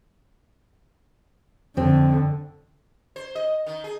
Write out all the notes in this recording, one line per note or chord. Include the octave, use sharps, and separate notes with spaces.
F2 D3 C4
C5
D#5
D#3
G#4